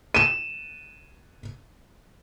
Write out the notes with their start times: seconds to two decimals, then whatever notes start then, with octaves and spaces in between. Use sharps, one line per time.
0.14 D#7 E7